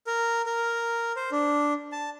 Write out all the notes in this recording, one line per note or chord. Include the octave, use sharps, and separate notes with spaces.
A#4
A#4
C5
D4
A5